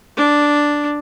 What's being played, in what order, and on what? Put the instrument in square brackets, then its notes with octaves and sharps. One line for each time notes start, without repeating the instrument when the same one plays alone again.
[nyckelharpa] D4